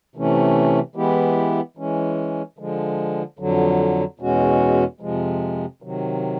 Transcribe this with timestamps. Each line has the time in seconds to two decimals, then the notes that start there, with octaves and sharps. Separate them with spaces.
0.15 C3 E3 A3 C#4
0.95 E3 G#3 B3 E4 G4
1.77 E3 G#3 C#4
2.58 D3 F3 G#3
3.39 F2 D3 F#3
4.20 E2 B2 G#3 C#4 F#4
5.00 F2 C3 F3 G#3
5.82 C3 D#3 F#3